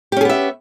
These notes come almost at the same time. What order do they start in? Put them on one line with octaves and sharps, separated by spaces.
G4 C#4 G#4 B3 E5